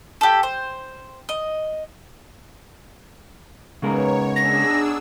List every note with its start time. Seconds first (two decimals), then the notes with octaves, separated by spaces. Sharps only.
0.21 G4 A4
0.43 C5
1.29 D#5
3.82 C#3 G#3 B3 D#4 A#4 C#5
4.36 D4 G#4 E6 A#6